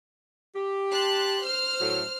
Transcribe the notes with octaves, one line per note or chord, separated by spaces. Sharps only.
G4
A5 C6 F#6
C5 F6
A2 F#3 A3